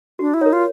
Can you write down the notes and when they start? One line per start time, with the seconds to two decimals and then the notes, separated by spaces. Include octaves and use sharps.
0.19 D4 F#4
0.34 E4
0.41 D#4 A#4 C#5
0.53 F4